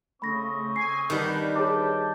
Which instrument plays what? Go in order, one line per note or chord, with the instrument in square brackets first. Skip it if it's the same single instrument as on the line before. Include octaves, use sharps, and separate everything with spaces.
[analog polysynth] C#3 A3 [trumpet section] C4 D#5 C#6 [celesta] B5 A#6
[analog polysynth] G#5 [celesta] C7
[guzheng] D#3 G3 [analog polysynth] D4 D#4 B4 [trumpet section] F#5 B5
[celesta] G#4 C#5 D6 [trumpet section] G5 A5